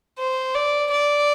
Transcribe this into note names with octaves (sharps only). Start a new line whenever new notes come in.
C5
D5
D5